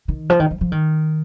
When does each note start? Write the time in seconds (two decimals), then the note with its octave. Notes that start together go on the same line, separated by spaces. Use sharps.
0.08 D#3
0.30 F3
0.40 D#3
0.51 F3
0.61 F3
0.72 D#3